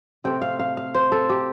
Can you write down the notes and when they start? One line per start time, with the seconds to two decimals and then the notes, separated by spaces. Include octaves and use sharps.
0.24 C3 A3 C4 G5
0.42 F5
0.59 F5
0.77 F5
0.94 C5
1.12 A4
1.29 G4